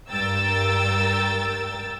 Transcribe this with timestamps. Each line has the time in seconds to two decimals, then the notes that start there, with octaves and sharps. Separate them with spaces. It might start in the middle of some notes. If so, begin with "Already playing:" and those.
0.11 G2 A#4 G5 E6 A6